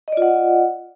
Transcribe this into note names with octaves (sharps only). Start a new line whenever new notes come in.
F4 D5 D#5 F#5